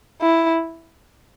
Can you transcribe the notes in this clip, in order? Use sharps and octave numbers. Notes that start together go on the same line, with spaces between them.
E4